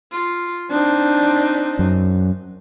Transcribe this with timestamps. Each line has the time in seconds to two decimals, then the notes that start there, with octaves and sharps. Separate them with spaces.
0.12 F4
0.71 C4 D4 D#4
1.79 F#2